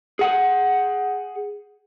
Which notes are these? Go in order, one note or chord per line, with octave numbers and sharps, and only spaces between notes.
G#4 F#5